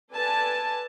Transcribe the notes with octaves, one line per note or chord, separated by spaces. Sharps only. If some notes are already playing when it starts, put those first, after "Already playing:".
A4 B4 D5 G#5 A5